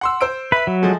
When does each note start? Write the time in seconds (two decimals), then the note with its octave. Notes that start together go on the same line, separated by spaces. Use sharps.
0.01 F#5 C6 E6
0.21 C5 E6 D7
0.52 B4 E5 B5
0.67 F#3
0.82 F3 G#3 A3